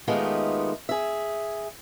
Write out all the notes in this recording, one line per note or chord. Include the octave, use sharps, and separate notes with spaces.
D#3 G#3 A3 B3 F4 G4
G#4 E5